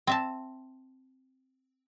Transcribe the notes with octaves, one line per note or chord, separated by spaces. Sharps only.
C4 E5 A5